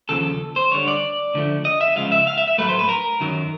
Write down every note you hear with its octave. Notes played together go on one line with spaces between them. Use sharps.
D#2 C#3 F3 A4
C5
D2 D3 G3 C#5
D5
D2 D3 F3 A3
D#5
E5
C#2 C#3 F3 G#3 F5
E5
F5
E5
E5
A2 F#3 A3 B4
C5
B4
A#4
F#2 D#3 F#3